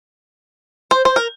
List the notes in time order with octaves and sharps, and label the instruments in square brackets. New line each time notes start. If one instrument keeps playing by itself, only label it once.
[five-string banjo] C5
C5
A#4